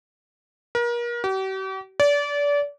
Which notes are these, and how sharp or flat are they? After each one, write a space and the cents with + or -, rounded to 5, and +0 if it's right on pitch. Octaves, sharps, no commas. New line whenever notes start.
A#4 +35
G4 -45
D5 -30